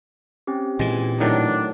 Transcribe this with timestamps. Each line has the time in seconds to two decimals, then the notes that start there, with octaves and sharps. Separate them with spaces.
0.47 C4 C#4 G4
0.79 A#2 E3 G#3
1.20 A2 D#3 F#3 D4